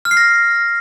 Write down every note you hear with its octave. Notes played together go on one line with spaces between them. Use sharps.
F6
C7
A#6